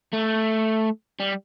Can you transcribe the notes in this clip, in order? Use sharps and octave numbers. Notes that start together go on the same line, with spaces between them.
A3
G3